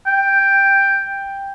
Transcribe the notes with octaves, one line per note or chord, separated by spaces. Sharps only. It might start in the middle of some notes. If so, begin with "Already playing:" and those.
G5